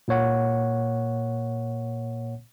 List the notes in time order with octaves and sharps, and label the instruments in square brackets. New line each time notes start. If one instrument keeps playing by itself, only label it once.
[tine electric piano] A#2 A#3 C#5 F#5